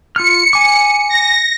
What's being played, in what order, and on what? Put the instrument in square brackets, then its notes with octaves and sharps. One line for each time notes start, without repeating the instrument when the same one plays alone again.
[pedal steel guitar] F4 F6 [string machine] C#7
[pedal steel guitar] G#5 D6
[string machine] A#6